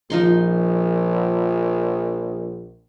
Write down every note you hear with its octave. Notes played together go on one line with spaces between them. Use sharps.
A#1 F3 D#4 C6